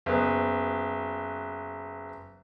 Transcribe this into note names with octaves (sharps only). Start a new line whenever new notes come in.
F#1 B3